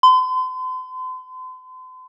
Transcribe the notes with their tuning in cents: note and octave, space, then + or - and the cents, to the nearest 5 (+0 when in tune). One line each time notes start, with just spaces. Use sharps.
C6 -40